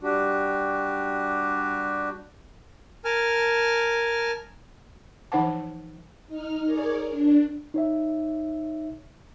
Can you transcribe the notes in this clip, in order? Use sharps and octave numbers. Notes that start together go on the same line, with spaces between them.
G3 D4 F#4 G4
A#4 G#5 A5 F6
E3 F3 D#4 C5 F#5 A5
D#4 F6
G#4 A#4 C#5 D5
D4
D#4 C#5 E5